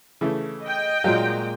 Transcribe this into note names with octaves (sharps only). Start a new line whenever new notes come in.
C#3 E3 A3
D#5 G5
A#2 F#3 G#3 A#3